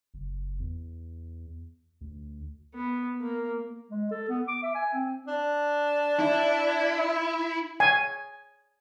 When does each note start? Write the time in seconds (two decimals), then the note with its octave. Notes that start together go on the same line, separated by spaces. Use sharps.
0.14 F#1
0.60 E2
2.01 D2
2.75 B3
3.21 A#3
3.90 G#3
4.11 A4
4.29 B3
4.48 D6
4.63 E5
4.75 G#5
4.93 C4
5.28 D4
6.19 E4
7.80 G#5